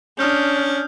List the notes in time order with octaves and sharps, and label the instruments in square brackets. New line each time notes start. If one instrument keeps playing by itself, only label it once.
[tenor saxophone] C#4 [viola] D4 [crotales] D#6 F6 G6